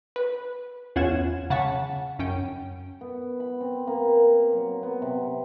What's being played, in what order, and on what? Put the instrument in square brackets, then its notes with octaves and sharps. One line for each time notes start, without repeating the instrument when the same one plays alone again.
[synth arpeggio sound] B4
E2 C#4 F4 F#5 G#6 E7
C#3 F#5 A5 C#6 B6
F#2 C#4 G5
[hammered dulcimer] B3
B5
C4
A#3
G4
F#3
B3
C3